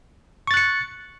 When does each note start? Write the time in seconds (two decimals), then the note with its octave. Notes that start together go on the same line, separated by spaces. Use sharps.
0.47 C#6
0.51 A6
0.54 F#6
0.57 C#7